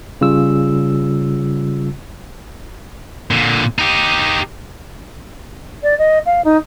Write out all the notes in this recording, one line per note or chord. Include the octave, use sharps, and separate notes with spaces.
C#3 G3 F4 E6
A#2 D3
D#4 G4
D5
D#5
F5
D#4